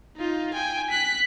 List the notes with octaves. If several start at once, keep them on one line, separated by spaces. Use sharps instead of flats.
D#4 F4
G5 G#5
F#6 B6